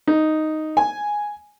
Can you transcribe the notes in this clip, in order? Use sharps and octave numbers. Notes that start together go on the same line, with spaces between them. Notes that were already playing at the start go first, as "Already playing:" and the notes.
D#4
G#5